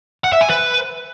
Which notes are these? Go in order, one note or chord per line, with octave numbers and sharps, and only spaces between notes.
F#5
E5
G#5
B4